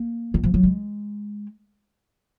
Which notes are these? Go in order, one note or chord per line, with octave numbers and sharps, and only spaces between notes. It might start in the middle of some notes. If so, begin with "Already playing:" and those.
Already playing: A#3
D#3
F3
F#3
G#3